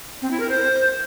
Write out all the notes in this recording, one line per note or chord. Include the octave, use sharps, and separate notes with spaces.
C4
E4
A#4
C5